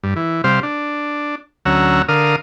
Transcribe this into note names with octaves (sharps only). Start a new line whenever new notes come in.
G2
E3
C3 G3 C5 F5
D4
D2 F#3 C#4 F#5 A#5 E6
D3 A#4 F5 D#6